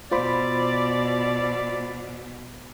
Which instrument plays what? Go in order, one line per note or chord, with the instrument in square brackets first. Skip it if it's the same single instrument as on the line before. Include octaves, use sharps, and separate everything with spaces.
[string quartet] B2 [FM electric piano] F4 C5 B5 [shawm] D5